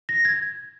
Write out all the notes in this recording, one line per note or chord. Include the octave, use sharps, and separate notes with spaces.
A#6
G#6